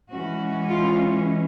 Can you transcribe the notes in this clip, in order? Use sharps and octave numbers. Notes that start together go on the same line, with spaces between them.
E3 G#3 C#4 F#4
F4